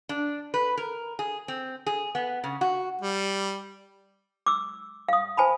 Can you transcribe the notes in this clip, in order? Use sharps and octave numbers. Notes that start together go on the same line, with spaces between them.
D4
B4
A#4
G#4
C4
G#4
B3
C#3
F#4
G3
D6 E6
F5 D#6
C5 G#5 A5 B5